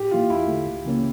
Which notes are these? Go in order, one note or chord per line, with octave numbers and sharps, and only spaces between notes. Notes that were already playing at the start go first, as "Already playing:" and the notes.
Already playing: A2 G4
E3 A#3 E4 F4
E2 E4
D3 A3
C#2
C#3 E3 A#3 C#4